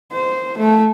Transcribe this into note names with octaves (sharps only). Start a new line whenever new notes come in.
C5
A3